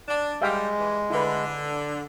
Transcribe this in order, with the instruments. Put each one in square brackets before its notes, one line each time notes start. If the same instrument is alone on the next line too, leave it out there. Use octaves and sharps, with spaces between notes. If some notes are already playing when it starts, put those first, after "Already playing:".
[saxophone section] D4
[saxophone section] G3 [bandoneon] G#3 [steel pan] E5 F5 G5
[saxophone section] E3
[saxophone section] D3 [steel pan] E4 B4